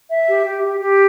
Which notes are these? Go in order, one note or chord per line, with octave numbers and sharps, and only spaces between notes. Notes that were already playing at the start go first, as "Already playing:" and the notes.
E5
G4
G4
G4
G4